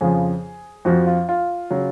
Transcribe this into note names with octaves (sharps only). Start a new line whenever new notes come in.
F2 C#3 F3 G#4
F2 F3 F#4
F4
F4
C#3 F#3